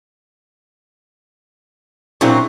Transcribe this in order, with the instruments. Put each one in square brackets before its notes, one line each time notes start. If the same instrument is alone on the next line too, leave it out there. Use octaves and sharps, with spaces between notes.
[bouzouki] A#2 F#3 C4 [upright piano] D4 E4 G#4